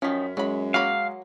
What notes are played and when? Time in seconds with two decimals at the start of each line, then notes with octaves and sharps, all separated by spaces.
0.02 F#2 D#3 F3 C#4 B6
0.37 F#2 F#3 G#3 B5
0.74 F#3 A#3 F5 B5